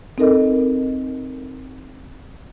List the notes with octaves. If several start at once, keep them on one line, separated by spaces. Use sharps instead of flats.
C4 D#4 A4 A#4 D#5